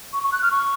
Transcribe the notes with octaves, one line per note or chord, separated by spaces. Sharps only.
C#6
C#6
F#6
F6
C#6